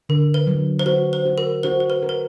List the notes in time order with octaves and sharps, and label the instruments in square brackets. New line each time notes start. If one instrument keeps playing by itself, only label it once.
[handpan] D3 [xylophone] A#4
[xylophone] B4
[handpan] F#3
[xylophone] C5
[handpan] F#4 [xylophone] B4
[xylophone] C5
[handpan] F#4
[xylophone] A#4
[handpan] F#4 [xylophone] C5
[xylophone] C5
B4
[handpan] A#4
[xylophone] B4